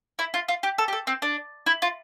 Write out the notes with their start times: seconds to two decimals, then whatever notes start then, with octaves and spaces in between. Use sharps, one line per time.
0.19 E4
0.34 F4
0.48 F4
0.63 G4
0.78 A4
0.88 G4
0.93 A4
1.07 C4
1.22 D4
1.66 E4
1.82 F4